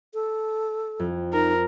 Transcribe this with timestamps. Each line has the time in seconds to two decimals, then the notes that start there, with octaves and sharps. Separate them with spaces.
0.14 A4
1.00 F2
1.33 D#4 A#4